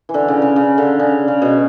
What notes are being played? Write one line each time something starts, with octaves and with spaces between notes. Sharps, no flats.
E3
D3
C#3
C#3
C#3
D3
C#3
C#3
B2